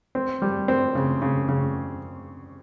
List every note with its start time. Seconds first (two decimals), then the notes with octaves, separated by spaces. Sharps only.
0.15 C4
0.42 G3
0.68 C4
0.95 C#3
1.22 C#3
1.49 C#3